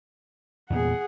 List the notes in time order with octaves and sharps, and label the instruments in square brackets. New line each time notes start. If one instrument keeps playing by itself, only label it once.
[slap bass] E2 A#2 B3 [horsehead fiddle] G#4 F#5